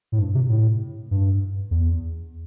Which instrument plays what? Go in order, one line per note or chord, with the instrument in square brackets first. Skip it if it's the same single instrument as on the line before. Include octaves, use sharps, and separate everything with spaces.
[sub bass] A2
G2
C3
A2
G2
E2